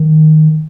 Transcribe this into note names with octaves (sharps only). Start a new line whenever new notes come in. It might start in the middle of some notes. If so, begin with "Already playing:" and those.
Already playing: D#3